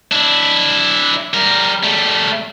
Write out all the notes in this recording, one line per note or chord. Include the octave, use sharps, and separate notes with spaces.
D4 E4
G3 A#4
G3 A3